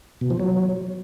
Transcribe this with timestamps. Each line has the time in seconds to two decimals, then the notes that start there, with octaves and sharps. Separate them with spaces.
0.21 B2
0.30 F3
0.40 F#3